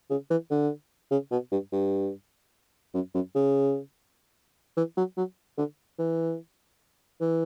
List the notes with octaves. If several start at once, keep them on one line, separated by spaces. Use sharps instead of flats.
C#3
E3
D3
C#3
B2
G2
G2
F#2
F#2
C#3
E3
F#3
F#3
D3
E3
E3